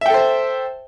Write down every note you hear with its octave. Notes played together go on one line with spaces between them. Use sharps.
A4 C5 E5 G5